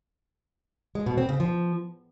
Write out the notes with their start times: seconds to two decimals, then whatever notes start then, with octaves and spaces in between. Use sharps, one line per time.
0.95 G#3
1.06 B2
1.18 C4
1.29 C#3
1.40 F3